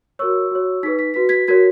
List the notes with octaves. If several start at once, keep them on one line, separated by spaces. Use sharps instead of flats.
F#4 A#4 C#5 C#6 E6
F#4 C#5
D#4 G#4 B4 B6
B6
F#4 B4 B6
G#6 B6
F#4 A#4 C#5 G#6 B6